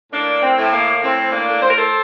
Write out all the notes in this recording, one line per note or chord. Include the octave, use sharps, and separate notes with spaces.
A2 A#3 D4
C4
A2
A#3
A2 C4
A#3 D4
A2
C5
A#4
A4 C5